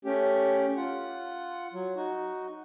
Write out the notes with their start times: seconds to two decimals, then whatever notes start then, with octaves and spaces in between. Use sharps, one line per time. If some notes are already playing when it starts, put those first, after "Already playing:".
0.05 A3 C#4 G4
0.77 F4 F#5
1.74 F#3
1.96 D#4 F#4